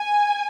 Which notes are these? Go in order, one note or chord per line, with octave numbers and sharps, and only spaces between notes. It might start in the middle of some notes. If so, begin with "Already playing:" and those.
Already playing: G#5